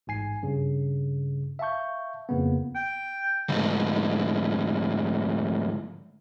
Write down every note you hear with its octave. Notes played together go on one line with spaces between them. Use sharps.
A1 G#2 G#5 C7
G2 C#3
E5 F5 A5 C#6 G6
F2 C#3 A#3 B3
G5
D2 G#2